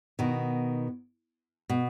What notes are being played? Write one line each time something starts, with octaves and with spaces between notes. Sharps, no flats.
B2 D#3
B2